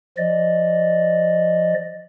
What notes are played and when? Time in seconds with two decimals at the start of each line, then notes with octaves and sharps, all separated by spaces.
0.17 F3 D5 D#5